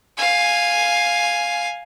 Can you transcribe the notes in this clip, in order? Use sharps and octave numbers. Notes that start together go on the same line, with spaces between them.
F5 G#5